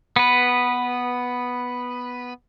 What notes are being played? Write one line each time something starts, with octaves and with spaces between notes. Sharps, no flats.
B3 B4